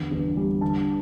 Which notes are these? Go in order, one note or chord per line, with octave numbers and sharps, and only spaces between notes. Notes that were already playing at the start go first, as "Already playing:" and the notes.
Already playing: E2 D3
G1
G3
D3 A5